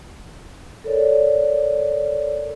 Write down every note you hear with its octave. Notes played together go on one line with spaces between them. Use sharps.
A4 A#4 C#5 D5